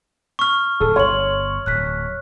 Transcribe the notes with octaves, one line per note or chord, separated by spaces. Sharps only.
C#6 F6
D1 A4
G1 C#5 C6 F#7
D1 F#6 B6